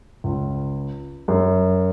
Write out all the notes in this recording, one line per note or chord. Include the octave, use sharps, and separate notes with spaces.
C#2
F#2